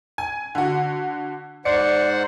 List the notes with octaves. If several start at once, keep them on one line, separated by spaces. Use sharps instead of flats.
G#5
D3 F#4
G#2 C5 D5 F#5 C#7